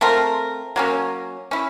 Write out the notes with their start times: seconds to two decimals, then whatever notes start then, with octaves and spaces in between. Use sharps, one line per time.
0.01 A3 C4 F4 A#4
0.76 F#3 A#3 C#4
1.51 C#4 E4